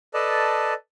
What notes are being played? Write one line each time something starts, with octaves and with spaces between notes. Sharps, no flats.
A4 B4 D5 D#5 A5